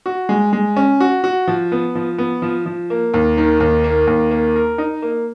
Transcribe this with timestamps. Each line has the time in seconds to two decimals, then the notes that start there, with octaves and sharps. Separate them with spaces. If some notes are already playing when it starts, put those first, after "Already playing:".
0.06 F#4
0.29 G#3
0.53 G#3
0.77 C#4
1.00 F#4
1.24 F#4
1.48 F3
1.72 B3
1.95 F3
2.18 B3
2.42 F3
2.66 F3
2.90 A#3
3.14 D#2
3.37 D#3
3.60 D#2
3.84 A#3
4.07 D#2
4.31 A#3
4.56 A#4
4.78 D#4
5.02 A#3